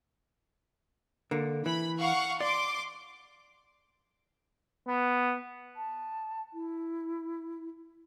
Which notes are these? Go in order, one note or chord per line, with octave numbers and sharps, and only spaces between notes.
D3 A#3
E3 B5
F5 F#5 C#6
D5 C6 D6
B3
A5
E4